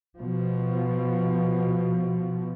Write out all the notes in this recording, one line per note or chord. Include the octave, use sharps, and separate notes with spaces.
B2 F3